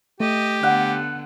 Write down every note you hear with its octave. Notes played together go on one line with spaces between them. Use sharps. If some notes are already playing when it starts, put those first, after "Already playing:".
A3 G4 D#5
D3 B3 F#5